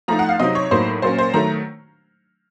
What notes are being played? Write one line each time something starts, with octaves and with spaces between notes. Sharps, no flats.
F3 A3 D#4 A#5
F#5
F5
C3 F#3 C4 D#4 D#5
C#5
A2 F#3 A#3 D#4 C5
A#2 F#3 A#3 C#4 C5
C5
D#3 F#3 A3 A#5